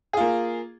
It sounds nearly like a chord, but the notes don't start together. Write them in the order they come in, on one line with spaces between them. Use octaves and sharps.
G#4 F4 A#3